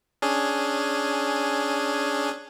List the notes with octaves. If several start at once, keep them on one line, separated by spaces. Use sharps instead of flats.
C#4 D4 G#4